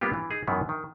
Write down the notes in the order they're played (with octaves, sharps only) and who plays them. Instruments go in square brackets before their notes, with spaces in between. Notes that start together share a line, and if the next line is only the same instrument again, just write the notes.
[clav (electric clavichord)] G3 A#3 B3 D4 F4 G4
E3
D#4 G#4
F#2 D#3 E3 F#3 B3
D#3